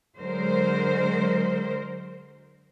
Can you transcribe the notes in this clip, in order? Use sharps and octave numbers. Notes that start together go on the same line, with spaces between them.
D3 F#3 G#3 A#4 C5